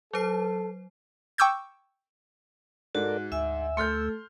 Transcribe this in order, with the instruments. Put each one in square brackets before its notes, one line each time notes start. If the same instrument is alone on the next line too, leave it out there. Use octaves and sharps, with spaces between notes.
[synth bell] F#3 C5 C7 [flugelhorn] A4
[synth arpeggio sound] G5 C#6 D6 E6 G6 G#6
[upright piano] G#2 [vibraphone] F#4 [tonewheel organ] A4 A#4 D5
[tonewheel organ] D2 E6 [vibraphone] E5 G#5
[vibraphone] A3 A4 [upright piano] C6 F6 G6